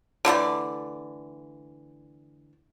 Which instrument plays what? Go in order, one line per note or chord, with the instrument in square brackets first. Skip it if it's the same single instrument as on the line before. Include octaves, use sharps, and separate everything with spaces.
[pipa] D3 E3 A3 D5